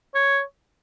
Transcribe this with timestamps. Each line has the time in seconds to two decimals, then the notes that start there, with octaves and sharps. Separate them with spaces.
0.15 C#5